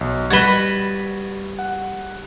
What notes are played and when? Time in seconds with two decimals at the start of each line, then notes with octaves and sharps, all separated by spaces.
0.01 B1
0.30 G3 F#4 B4 G#6 A6 E7 G7
1.59 F#5